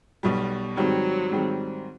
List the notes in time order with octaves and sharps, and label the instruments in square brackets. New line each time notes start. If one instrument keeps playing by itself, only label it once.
[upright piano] B1 B2 G3
[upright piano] G#2 D#3 G3 C4 [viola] F#3
[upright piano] G#2 D#3 G3 C4